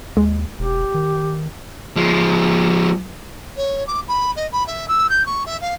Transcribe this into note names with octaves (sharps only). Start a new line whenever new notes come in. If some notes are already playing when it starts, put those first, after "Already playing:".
D#2 G#3
E1 G4
D#3
F3 G#3
C#5
D6
B5
D#5
B5
E5
E6
G6
C#6
E5
F5